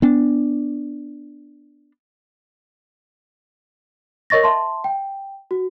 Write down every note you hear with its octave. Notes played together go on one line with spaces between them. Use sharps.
B3 D4
A#4 C#5 D#5 C#6 A6 A#6
E5 A5 C6
G5
F#4